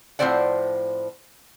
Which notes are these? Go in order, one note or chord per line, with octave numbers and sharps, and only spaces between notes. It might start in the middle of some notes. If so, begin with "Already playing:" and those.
A2 F3 C4 C5 D5 F#5